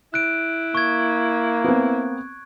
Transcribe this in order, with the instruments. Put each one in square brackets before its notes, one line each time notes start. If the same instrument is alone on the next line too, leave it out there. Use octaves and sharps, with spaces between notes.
[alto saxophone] E4 [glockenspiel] F#6 D7
[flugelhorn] A#3 [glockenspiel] C#6 G#6
[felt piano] B3 C4